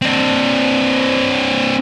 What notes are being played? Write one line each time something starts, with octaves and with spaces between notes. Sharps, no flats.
C4 D4